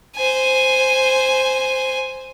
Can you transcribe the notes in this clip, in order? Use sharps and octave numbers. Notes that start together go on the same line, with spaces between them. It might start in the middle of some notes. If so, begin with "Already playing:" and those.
C5 G#5